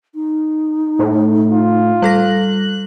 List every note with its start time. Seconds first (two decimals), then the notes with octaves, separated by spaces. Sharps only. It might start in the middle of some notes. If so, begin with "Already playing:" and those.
0.15 D#4
0.99 A2
1.51 F4
2.02 G3 A4 F#6 A#6